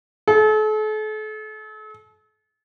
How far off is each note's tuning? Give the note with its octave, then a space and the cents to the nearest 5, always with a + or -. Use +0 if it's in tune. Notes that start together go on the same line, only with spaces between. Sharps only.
A4 -40